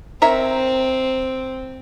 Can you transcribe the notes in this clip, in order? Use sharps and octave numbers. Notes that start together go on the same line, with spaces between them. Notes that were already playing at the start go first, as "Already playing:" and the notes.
C4 A#4 C#5 E5